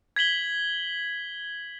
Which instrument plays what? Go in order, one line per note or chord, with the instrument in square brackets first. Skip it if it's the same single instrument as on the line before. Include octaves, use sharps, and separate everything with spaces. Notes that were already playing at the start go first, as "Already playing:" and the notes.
[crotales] G#6 B6 F#7 G7